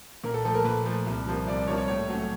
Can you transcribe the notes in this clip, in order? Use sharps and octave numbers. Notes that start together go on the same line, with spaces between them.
A#2 A#4
A4
F3 A3 A4
A#4
A#2 B4
F3 A3
C2
C3 F3 A#3
C2 D5
D5
C3 F3 A#3 C#5
C#5
A2 C#5
F#3 A3 C#4